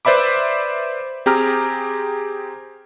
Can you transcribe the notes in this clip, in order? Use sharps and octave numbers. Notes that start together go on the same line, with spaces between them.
B4 C5 D5 E5 B5 D6
C4 G4 G#4 A#5 F6